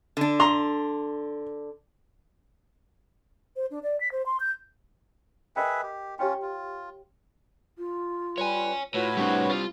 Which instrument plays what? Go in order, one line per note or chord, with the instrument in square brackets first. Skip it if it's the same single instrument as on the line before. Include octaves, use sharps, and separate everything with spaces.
[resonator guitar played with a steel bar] D3 D4
[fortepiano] A#5 C6
[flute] C5
D4
D5
B6
C5
C6
G6
[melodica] G#4 B4 E5 [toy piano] A#4 D#5 G5
[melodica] G4
[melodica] C#4 F4 [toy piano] G4 C#5 G5
[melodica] F4
[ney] F4
[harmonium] G3 B4 [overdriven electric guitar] C#5 G#5
[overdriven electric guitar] A2 [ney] F4 [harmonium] F#4 B4 C#5
[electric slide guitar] G3 C4 [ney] D4
[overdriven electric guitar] F4